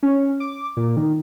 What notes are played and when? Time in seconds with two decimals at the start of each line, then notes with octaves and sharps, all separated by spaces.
0.03 C#4
0.40 D6
0.77 A#2
0.97 D#3